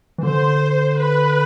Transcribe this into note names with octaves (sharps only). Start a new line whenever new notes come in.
E3
D3 C5
B4